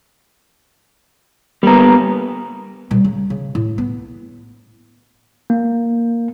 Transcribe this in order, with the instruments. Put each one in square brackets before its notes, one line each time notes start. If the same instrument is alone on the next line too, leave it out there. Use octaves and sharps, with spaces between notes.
[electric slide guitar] G3 B3 [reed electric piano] A#3 A#5
[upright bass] A#2 G3
C#3
C#3
A2
B3
[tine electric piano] A#3